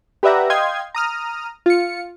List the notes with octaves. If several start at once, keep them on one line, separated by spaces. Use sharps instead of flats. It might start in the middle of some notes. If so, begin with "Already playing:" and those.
G4 B4 D5 E5 F#5 A#5
D#5 F5 G5 C6 D#6 G#6
A#5 D#6 F6
F4 C#7